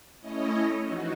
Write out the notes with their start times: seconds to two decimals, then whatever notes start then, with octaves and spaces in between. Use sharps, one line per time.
0.20 A3 C#4 E4 C#5 D#5
0.83 E3 F3 D#4 F#4